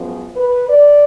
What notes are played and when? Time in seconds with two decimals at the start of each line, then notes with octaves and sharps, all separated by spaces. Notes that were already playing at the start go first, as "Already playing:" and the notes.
Already playing: F#2 F3 G#3 B3
0.36 B4
0.69 D5